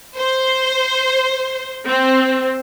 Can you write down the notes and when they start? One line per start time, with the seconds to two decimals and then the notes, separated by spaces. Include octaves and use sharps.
0.17 C5
1.86 C4